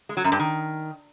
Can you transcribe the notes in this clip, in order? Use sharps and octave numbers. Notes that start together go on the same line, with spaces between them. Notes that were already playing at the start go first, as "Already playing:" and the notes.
G#3
F#3
F#2
G2
D#3